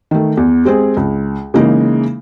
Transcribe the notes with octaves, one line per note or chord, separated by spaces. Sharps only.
D#3 A3
E2
G#3 C4 G4 G#4
C#2
C#3 E3 G#3 A#3 D#4